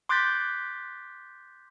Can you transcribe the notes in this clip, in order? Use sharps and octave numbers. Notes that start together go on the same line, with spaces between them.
C6 D6 F#6 G6 A6 B6